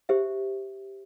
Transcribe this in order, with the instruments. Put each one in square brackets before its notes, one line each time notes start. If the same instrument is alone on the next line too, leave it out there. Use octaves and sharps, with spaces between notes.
[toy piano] G4 C5 E5